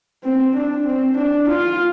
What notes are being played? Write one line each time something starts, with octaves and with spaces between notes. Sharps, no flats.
C4
D4
C4
D4
F4